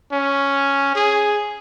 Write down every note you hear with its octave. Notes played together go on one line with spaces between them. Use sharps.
C#4
G#4